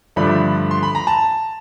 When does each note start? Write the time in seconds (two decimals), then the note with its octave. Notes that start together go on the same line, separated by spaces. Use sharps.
0.16 G2 D3 F3 A3 D4 B5
0.71 C6
0.83 B5
0.95 A#5
1.07 A5